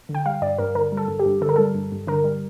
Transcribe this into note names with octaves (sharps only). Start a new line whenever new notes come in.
D3
G5
G3 F5
G2 D5
G2 A#4
D3 A#4
G3
A4
G2
G4
G2
D3 A4
A#4
G3 A4
G2
G2
D3 A#4
G3